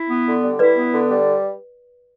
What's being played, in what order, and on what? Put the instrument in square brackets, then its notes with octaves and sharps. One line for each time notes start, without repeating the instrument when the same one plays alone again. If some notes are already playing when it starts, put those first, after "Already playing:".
Already playing: [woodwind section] E4
B3
D3
G3
[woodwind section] E4 [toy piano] B4 D5
[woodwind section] B3
D3
G3